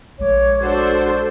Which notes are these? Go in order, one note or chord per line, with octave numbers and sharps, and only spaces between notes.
A#1 G#3 C#5 D6
D4 F#4 A4 C5